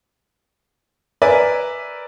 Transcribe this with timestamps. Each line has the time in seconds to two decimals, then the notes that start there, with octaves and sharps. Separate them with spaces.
1.22 A#4 B4 D5 E5 G#5